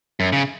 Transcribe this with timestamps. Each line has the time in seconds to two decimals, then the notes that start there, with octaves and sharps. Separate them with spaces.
0.20 F#2
0.33 C#3